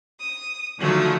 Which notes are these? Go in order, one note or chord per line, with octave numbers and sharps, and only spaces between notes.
D#6
D3 D#3 F3 F#3 A3